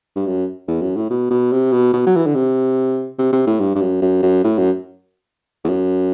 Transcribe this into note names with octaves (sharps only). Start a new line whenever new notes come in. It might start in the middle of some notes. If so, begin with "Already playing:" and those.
G2
F#2
E2
F#2
A2
B2
B2
C3
B2
B2
F#3
E3
D3
C3
C3
C3
A2
G2
G2
F#2
F#2
F#2
A2
F#2
E2
F#2